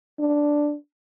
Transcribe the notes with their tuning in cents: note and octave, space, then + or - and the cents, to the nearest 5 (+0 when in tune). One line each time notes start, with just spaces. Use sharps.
D4 +0